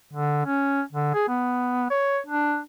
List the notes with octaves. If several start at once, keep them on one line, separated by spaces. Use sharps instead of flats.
D3
C#4
D3
G#4
B3
C#5
D4